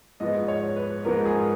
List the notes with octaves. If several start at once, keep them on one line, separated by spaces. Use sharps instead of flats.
G#2 F3 B3 D#5
C#5
B4
G#2 F3 B3 A#4
G#4